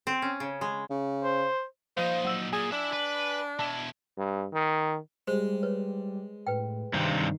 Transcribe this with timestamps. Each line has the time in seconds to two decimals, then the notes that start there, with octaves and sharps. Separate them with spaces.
0.07 C4
0.22 C#4
0.40 C#3
0.61 G#3
0.91 C#3
1.24 C5
1.97 A#2 F3 D#4 C5 F5
2.25 F#3 E6 F#7
2.53 A#2 G#4 G#5
2.72 D4 E4 E5
2.93 B4
3.59 B2 E4 A5
4.18 G2
4.53 D#3
5.28 G3 G#3 C5
5.63 B4 C#5
6.47 A2 B4 G5
6.94 G2 C3 D#3 C4